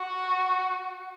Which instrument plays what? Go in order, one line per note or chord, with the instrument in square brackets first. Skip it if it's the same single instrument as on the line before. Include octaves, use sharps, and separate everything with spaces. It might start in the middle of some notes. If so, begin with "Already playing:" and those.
Already playing: [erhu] F#4